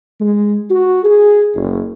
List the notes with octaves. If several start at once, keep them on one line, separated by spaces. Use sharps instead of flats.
G#3
F#4
G#4
F#1